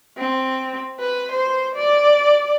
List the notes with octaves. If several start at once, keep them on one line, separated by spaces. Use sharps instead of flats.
C4
B4
C5
D5